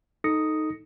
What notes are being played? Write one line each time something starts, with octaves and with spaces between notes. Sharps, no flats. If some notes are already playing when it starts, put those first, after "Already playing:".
D#4 A4 D#6 A#6 C#7